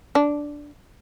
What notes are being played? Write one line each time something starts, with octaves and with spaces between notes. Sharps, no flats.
D4